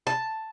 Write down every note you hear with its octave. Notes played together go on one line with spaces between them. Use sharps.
A5